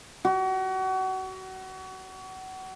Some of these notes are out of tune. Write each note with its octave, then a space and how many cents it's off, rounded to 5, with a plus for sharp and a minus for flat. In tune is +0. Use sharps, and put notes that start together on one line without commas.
F#4 +30